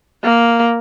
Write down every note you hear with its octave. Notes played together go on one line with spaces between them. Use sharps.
A#3